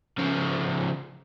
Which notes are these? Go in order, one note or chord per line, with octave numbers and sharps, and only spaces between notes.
C#3 F3